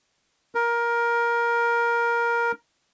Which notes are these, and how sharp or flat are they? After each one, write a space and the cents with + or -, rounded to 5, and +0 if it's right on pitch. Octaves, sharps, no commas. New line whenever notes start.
A#4 +15